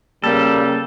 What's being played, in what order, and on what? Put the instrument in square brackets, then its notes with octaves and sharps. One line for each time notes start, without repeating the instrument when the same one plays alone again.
[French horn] C#3 [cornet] G3 [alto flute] A#3 [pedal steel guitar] A4